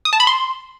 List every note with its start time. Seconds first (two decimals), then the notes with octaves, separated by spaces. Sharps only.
0.05 D#6
0.13 A5
0.20 B5
0.27 C6